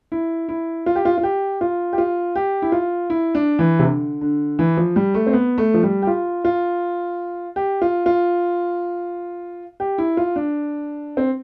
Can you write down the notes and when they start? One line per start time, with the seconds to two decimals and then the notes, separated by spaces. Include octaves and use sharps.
0.12 E4
0.49 E4
0.86 F4
0.95 G4
1.05 F4
1.18 F4
1.23 G4
1.61 F4
1.93 G4
1.98 F4
2.36 G4
2.62 E4
2.72 F4
3.10 E4
3.35 D4
3.59 E3
3.79 C3
3.84 D3
4.21 D3
4.59 E3
4.77 F3
4.96 G3
5.14 A3
5.27 C4
5.33 B3
5.58 A3
5.74 F3
5.83 G3
6.02 G4
6.07 F4
6.45 F4
7.56 G4
7.81 F4
8.06 F4
9.80 G4
9.98 E4
10.17 F4
10.36 D4
11.17 C4